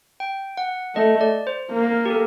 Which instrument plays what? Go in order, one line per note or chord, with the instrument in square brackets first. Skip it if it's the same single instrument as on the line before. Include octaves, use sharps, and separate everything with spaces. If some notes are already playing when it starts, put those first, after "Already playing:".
[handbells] G5
F#5
[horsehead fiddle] A3 [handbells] D#5
[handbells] D5
C5
[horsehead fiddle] A#3
[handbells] G4
A4